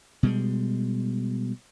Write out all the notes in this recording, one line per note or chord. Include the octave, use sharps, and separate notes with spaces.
B2 G3 G#3